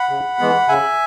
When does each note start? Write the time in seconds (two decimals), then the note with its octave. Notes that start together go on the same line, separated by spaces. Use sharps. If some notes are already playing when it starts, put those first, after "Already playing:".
Already playing: F#5 B5
0.10 C#3
0.39 E3 G#3 B3
0.69 C#3 E5 G#5